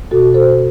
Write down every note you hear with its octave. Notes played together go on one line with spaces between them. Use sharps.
B2 F#4 A4
A4 C5